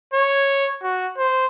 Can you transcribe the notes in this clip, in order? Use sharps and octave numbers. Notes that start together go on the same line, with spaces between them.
C#5
F#4
C5